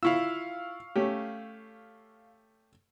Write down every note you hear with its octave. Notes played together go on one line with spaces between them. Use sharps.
E4 F4 F5 C#6 E6
A3 C#4 G4